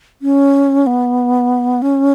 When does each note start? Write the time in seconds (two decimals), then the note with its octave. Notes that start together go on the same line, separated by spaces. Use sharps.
0.22 C#4
0.87 B3
1.82 C#4